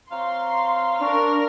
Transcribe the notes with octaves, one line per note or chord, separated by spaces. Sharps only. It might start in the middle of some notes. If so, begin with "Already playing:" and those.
C4 C#5 F5 A#5 C6
D4 A#4 C#6 F6